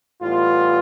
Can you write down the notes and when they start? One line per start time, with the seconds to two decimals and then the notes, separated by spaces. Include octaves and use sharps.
0.21 A2 E3 G3 B3 F4